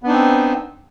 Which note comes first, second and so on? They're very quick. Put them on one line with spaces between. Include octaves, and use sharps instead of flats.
B3 D4 D#4 C4